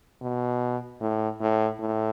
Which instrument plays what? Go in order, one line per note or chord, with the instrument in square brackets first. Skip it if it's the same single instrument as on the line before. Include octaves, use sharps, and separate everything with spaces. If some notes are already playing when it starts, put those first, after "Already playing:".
[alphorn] B2
A2
A2
A2